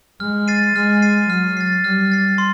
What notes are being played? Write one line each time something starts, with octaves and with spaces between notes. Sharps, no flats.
G#3 F6
A6 C7 D#7
G#3 F6
A6 C7 D#7
F#3 F6
A6 C7
G3 F6
A6 C7
C6